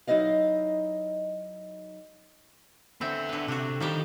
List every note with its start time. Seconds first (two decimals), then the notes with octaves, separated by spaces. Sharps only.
0.07 F#3 D#4 E4 D#5 F5
3.01 D3 B3 C4 E5
3.29 D3 B4
3.48 C3 D4 F#4
3.80 D#3 F3 G3 D#4 G4